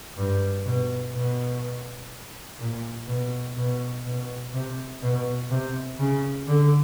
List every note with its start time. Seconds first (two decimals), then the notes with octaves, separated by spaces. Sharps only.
0.17 G2
0.65 B2
1.14 B2
2.59 A#2
3.08 B2
3.57 B2
4.05 B2
4.54 C3
5.02 B2
5.51 C3
5.99 C#3
6.48 D3